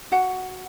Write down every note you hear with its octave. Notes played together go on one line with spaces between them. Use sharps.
F#4 F#5